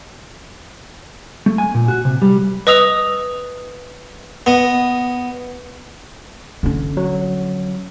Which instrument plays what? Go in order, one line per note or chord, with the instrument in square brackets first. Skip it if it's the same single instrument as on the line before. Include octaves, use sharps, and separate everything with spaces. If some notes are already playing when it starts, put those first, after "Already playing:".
[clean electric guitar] A3
G#5
A#2
F#4
C3
G3
[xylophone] B4 D#5 D#6 E6 F7
[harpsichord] B3 D#5
[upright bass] D3 C#4
[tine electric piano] F#3